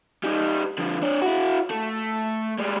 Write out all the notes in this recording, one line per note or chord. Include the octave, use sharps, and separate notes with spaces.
G3 D#4
D3 F3
D4 C#5
E4 F#4
A3
G3 G#3